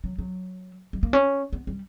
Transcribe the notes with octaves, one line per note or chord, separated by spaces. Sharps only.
F#3
F#3
G3
A#3
C#4
B3
G3